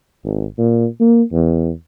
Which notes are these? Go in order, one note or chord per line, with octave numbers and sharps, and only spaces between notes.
G#1
A#2
A#3
E2